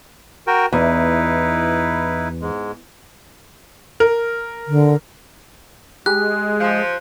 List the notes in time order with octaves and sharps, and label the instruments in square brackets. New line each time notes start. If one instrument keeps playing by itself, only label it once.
[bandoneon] F#4 A#4 G5
[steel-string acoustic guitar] E2 [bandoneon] D#4 E4 B4
[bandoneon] G#2 G#3
[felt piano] A#4
[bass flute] D3
[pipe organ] G#3 [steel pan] G4 G#4 [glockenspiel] F#6
[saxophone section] F3